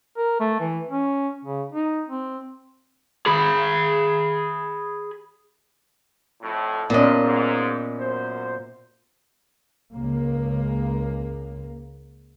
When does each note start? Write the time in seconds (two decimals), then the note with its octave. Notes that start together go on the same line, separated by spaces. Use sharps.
0.17 A#4
0.40 A3
0.60 E3
0.90 C#4
1.44 C#3
1.72 D#4
2.08 C4
3.26 G#4 B5
6.42 F2 A2
6.90 G2 A#2 D3 B3 C#4 D4 D#5
7.22 G#2
7.98 F#2 C5
9.93 C#2 A#3